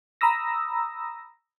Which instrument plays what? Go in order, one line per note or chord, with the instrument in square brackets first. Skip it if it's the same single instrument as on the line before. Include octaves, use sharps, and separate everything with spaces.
[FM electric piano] A#5 B5 D#6 E6 A#6